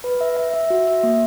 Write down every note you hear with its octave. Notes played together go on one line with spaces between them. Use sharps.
B4
E5
E5
E5
F#4
E5
A#3